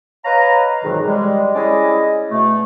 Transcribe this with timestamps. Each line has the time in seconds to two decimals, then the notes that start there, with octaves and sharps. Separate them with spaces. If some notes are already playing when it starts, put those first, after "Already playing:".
0.24 B4 C#5 D#5 F5 A#5
0.83 F2 G#2 B2 D#3 E3 F#3
1.06 G3 G#3
1.54 G#3 C#4 E4 D5 D#5
2.31 B2 A3